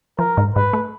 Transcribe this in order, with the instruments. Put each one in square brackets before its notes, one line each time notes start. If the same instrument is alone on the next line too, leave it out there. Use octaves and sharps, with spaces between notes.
[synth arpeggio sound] F3 [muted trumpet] A#4
[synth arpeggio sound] G#2
[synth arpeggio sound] G#2 [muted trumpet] B4
[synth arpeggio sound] A3